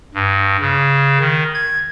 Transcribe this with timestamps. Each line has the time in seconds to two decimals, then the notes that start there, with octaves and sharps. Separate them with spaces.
0.14 G2
0.61 C#3
1.20 D#3
1.55 G#6